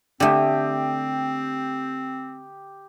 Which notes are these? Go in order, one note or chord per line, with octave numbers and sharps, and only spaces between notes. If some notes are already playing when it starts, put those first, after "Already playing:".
D3 A3 C4 G4 D#6